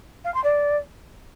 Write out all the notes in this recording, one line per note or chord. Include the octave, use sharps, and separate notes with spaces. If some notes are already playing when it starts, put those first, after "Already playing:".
F5
C6
D5